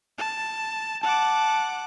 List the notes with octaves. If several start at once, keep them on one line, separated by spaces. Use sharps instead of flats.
A5
F#5 A5 D6